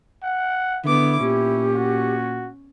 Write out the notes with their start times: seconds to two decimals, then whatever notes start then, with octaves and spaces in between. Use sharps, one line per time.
0.23 F#5
0.85 D3 B3 E4 D6
1.20 A#2 C#4 G4
1.75 F#4